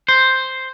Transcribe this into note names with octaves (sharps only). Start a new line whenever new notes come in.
C5